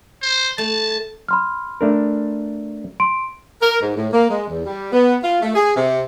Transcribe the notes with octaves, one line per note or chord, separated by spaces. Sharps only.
C5
A3 A5
B5 C6 F6
A3 D4 A#4
C6 D7
A#4
G#2
A2
A#3
G#3
E2
G3
B3
F4
A3
G#4
C3